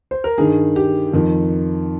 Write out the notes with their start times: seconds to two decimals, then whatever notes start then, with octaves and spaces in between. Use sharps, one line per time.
0.11 C5
0.24 A#4
0.38 G2 D#3 G#4
0.76 G4
1.13 F2 D#3